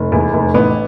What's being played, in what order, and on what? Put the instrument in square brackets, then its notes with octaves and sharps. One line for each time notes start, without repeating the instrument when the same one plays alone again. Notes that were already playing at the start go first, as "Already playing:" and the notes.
Already playing: [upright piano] F1
E2
F1
A1 B3